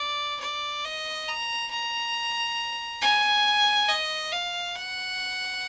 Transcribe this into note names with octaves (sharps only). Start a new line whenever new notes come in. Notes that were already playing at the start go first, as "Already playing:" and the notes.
Already playing: D5
D5
D#5
A#5
A#5
G#5
D#5
F5
F#5